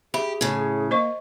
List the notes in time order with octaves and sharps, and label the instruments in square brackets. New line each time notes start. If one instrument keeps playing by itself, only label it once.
[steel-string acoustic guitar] G4 [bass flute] G#4 [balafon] E5 B5
[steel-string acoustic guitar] A2 C#3
[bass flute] A#3 [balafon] C5 D#5 C#6